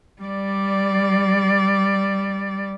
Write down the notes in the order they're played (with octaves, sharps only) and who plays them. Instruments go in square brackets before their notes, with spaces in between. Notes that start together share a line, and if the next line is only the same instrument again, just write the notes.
[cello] G3 D5